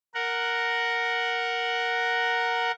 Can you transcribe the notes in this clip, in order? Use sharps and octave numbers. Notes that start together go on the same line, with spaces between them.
A#4 F#5